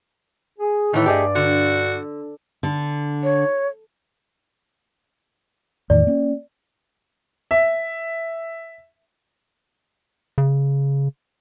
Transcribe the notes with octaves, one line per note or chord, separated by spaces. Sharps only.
G#4
A2 D#3 E3 A3
G2 G4 G#4 D5 D#5
D3 F#4
D3
C#5
E2 A2 D#3 D5
A#3 C#4
E5
C#3